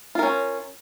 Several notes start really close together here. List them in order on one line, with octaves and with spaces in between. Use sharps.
F4 A#4 C#4